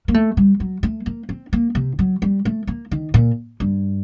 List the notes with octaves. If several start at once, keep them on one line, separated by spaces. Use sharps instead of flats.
A#3
A3
G3
F#3
A3
A#3
C4
A#3
C3
F#3
G3
A3
A#3
D#3
A#2
G2